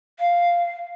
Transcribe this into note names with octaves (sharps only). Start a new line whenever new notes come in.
F5